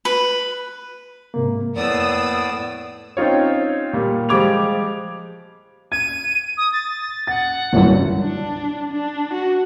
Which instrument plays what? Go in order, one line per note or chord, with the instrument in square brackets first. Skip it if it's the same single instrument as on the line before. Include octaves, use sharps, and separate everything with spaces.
[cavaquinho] B4
[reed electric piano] G#2 C3 A#3
[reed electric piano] F2 [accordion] A2 B3 D5 [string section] A#3 D#6 E6
[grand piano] C4 C#4 D#4 F4 C#5
A#2 G3
F3 G3 G#3 D6 G#6 F7
[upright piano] G#6 [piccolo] D#7
[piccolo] D#6
A6
[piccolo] F#5 [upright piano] A6
[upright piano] G1 C2 F#2
[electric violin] D4
D4
F#4